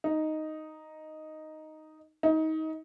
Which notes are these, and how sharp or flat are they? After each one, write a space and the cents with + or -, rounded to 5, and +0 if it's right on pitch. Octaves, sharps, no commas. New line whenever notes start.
D#4 +0
D#4 +25